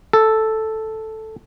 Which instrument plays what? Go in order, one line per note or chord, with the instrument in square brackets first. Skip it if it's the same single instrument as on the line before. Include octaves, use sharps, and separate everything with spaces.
[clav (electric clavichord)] A4